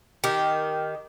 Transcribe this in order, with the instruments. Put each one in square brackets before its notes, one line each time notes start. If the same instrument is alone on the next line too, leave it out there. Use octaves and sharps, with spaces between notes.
[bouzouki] D#3 G4